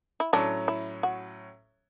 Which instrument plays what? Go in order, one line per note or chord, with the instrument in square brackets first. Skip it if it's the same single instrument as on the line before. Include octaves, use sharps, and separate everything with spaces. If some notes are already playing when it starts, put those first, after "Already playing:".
[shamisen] E4
[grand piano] A2 F#3 C#4 [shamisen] D4
[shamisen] E4
F#4